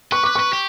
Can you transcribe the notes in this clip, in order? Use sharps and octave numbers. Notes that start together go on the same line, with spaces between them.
B4 C#6
B4 D6
B4 C#6
G4